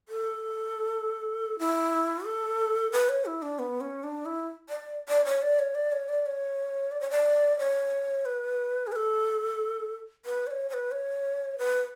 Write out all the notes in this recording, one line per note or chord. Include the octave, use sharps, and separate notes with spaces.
A4
E4
A4
B4
C#5
E4
D4
B3
C#4
D4
E4
D5
D5
C#5
D5
C#5
D5
C#5
D5
C#5
D5
C#5
D5
C#5
B4
G#4
B4
A4
B4
D5
C#5
C#5
B4
C#5
B4